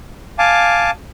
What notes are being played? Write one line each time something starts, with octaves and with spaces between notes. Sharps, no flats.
F5 G#5 A5 D6